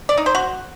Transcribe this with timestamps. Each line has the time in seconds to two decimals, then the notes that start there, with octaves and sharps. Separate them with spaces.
0.09 D5
0.18 D#4
0.26 C5
0.35 F#4